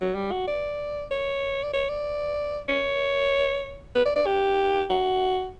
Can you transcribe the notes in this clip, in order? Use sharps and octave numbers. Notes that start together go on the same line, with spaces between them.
F#3
G3
F#4
D5
C#5
D5
C#5
D5
C#5
B4
D5
D5
G4
F#4